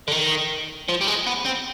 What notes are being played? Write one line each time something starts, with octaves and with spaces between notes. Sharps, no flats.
D3
D#3
F3
G3
G#3
B3
C4